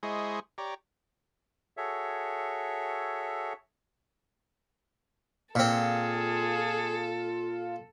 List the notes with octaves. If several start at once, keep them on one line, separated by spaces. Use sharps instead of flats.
G#3 E4 G#4 C5 D#5 C#6
G4 C#5 D5 A#5
F#4 G#4 A4 C#5 E5
A#2 C4 F4 G#4 A4